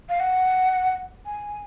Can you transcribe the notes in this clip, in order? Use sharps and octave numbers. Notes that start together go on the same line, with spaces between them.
F5
F#5
G#5